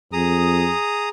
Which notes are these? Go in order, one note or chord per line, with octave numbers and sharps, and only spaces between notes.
F2 G#4 A#5 D#6